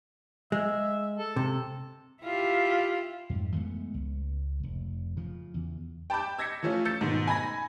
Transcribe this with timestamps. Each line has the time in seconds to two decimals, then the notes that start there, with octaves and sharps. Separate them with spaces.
0.52 G#3 E5
1.18 A4
1.36 C3
2.22 E4 F4 G4
3.30 F2 G#2
3.54 E3 G#3 A3 B3
3.94 C#2
4.63 F1
5.17 C#3 F3
5.54 E2
6.10 G5 A5 B5 D6 G6
6.38 E6 G#6 A#6 B6 C#7
6.63 E3 F3 A3 C#4 F4
6.85 E6 G6 A6 C#7
7.01 G#2 B2 D#3
7.27 G#5 B5 G#6 A#6